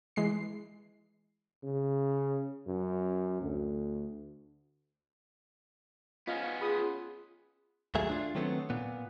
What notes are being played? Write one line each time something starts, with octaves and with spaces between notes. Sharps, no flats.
E3 G#3 C7
C#3
F#2
D2
B3 C#4 F4 D#5 F5
F4 G#4 B5 D#6
D#2 A#2 F#3 A3 G#4 E5
D4 F4
D#3 F#3 A3 B3 C4
A#2 B3